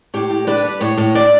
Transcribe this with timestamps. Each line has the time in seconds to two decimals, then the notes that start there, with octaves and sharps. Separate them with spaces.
0.14 A2 G4
0.30 A2
0.47 D4 B4
0.65 G3
0.81 A2 C#5
0.97 A2
1.15 D4 D5